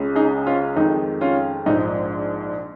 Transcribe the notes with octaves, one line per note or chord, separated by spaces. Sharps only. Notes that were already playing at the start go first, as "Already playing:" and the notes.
Already playing: C#2 C#3 G#3
D#4 G#4
C#4 F4
F2 D#3 G#3 D#4
C#4 F4
A#1 G#2 F3 D#4